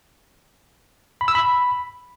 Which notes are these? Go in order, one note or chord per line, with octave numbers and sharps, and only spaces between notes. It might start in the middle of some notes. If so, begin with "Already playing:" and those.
B5
E6
B5